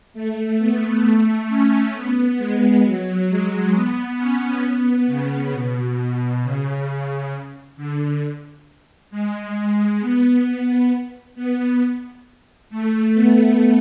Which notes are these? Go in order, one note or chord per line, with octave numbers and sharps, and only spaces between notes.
A3
B3
A3
C#4
B3
G#3
F#3
G#3
B3
C#4
B3
C#3
B2
B2
C#3
D3
G#3
B3
B3
A3
B3